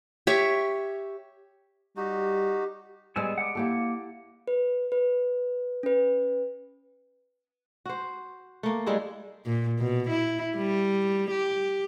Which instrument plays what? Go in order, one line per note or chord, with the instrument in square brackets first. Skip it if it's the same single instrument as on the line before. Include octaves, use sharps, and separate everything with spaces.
[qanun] G4 C#5 E5
[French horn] G3 [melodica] D#4 F#4 [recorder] G4
[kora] G3 G#3 [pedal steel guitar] B3 G#4 E6
[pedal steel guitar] F#5 D6
[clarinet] A#3 [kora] E4 G4 A4
[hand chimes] B4
B4
C#4 B4
[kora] F#4 C5
A3 A#3
G3 G#3 E4 G#4
[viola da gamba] A#2
B2
E4
G3
G4